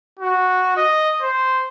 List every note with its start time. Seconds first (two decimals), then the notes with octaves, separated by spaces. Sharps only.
0.19 F#4
0.77 D#5
1.22 C5